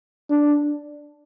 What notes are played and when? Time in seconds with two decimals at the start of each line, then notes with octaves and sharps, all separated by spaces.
0.30 D4